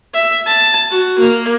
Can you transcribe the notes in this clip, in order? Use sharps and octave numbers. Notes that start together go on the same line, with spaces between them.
E5
A5
F#4
A#3